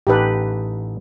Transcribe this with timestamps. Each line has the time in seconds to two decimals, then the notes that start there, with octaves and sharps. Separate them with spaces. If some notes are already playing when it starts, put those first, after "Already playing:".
0.07 A1 D#4 G4 A4 B4